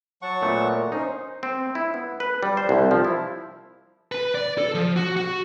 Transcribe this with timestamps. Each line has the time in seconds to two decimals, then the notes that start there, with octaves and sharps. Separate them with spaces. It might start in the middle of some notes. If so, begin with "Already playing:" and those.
0.22 F#3 F#5 A5 C#6
0.42 A#2 A3 B3
0.63 A#4
0.92 C#4 D#4 C5
1.43 C4
1.75 E4
1.94 B3
2.20 B4
2.43 G3
2.57 C5
2.69 C2
2.91 F3
3.04 E4
4.12 B4
4.35 D5
4.58 A4
4.74 F3
4.96 F#4
5.16 F#4